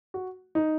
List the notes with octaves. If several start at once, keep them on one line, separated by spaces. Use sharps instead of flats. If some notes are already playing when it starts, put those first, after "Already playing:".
F#4
D#4